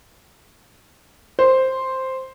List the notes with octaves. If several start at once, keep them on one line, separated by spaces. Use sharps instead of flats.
C5